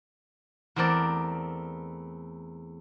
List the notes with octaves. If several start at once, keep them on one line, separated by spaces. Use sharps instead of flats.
E2 A3 C4 A#4 D5